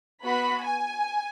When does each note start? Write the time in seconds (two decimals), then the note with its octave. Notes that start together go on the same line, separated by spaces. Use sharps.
0.24 B3 F#4 B5
0.64 G#5